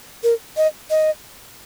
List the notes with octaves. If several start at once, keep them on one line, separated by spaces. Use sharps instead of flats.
A#4
D#5
D#5